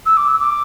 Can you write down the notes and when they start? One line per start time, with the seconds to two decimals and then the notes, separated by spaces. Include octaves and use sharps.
0.06 E6
0.17 D6
0.28 E6
0.39 D6